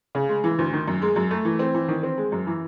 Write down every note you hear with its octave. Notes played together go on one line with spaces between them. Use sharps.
C#3
G#3
E3
D2
D#3
F#2
G#3
F#2
A3
E3
C4
E3
D#3
C4
G#3
F#2
E3